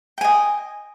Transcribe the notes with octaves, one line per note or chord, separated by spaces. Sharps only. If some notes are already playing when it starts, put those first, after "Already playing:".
D#5 G5 G#5